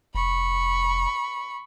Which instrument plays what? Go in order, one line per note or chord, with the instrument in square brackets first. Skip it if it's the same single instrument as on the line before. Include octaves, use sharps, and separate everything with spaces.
[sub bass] F1 [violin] B5 C#6